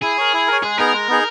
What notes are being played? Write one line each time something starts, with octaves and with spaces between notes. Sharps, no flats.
E4 G#4
A#4 C#5
E4
A#4 C#5
G#3 G#4
B3 D#4 G#4 A#4
G#3
B3 D#4 G#4